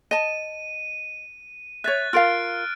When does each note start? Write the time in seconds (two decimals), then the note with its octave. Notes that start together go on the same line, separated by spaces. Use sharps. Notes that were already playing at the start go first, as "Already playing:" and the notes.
0.11 D#5 A5 D#7
1.84 C#5 E5 F#6 A6
2.13 F4 A#4 F5 F6 D7